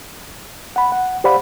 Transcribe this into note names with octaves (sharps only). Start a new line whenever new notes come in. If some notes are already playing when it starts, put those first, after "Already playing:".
F#5 B5
F#5
G4 C5 D5 F5 F#5 B5